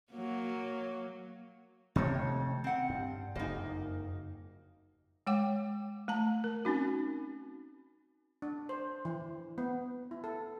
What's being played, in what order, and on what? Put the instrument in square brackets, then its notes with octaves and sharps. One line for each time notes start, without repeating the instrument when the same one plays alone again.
[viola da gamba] F#3 A#3
[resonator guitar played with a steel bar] F2 G4 C#5 [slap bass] C3 D#3 A3
[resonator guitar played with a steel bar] C4 F#5
[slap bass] G2
[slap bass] F#1 F2 G#2 [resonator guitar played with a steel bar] A#3 D#4
[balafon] G#3 C#5 F#5 G5 D6
A3 A5 A#5
A#4
C4 C#4 D#4 F#4
[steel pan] D4
C5
E3
B3
E4
A4